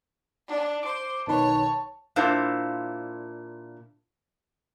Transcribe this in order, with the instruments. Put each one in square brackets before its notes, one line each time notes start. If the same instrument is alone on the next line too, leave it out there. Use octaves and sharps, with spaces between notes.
[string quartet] D4
[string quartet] C5 [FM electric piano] D6
[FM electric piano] B1 D#3 B4 [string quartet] C#5 [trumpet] A5
[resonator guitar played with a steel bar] A#2 D4 E4 A#4 C5 F5